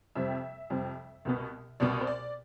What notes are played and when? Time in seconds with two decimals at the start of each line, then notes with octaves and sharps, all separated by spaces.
0.15 F2 C3 G3 C4 E5
0.70 F2 C3 G3 C4
1.25 C2 B2 B3
1.80 C2 B2 B3 D5
2.01 C5
2.07 D5